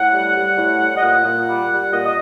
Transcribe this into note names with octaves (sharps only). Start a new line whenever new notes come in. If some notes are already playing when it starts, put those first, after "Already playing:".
Already playing: A2 F#5
G3
G3
A2
G3
D#5
A#2 F#5
A#2
G3
G3
A#2 D#5
D#5